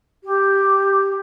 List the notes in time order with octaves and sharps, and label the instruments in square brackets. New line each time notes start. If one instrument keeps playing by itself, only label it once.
[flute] G4